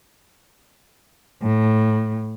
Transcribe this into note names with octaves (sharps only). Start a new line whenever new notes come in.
A2